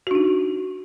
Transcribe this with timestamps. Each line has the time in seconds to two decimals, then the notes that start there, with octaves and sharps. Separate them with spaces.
0.07 F#4
0.11 D4
0.15 D#4